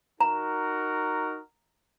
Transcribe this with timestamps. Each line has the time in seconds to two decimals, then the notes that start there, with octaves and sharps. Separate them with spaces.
0.21 D#4 F#4 A#4 A#5